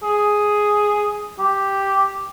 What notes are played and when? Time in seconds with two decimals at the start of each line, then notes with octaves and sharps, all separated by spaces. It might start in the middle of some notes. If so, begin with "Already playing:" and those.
0.03 G#4
1.39 G4